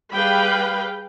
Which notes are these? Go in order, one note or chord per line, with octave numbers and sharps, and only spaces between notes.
G3 G#4 B4 F5 G5 B5